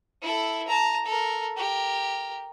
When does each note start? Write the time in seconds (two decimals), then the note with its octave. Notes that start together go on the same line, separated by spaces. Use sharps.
0.22 E4 A4
0.68 A5 A#5
1.05 A4 A#4
1.57 G4 A#4